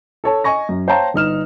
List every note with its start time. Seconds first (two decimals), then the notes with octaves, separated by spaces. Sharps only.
0.24 A4 C#5 A5
0.44 D#5 G#5 C#6 A#6
0.69 F#2
0.88 C5 C#5 F5 G5 A5 A#5
1.14 G1 D#4 F6 E7